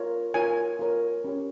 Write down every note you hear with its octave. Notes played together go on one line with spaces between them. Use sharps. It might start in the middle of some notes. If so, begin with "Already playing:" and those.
Already playing: F4 A#4 C#5
F4 A#4 C#5 G#5
F4 A#4 C#5
C#4 G4 C#5